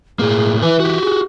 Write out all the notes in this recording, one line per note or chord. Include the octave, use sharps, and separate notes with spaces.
A2 A#3 G#4
E3 B4 G#5
F#4 G4
G#4